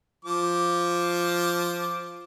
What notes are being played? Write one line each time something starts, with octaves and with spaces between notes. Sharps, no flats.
F3 D6